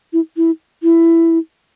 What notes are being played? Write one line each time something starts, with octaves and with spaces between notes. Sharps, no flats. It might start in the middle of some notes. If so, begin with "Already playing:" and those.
E4
E4
E4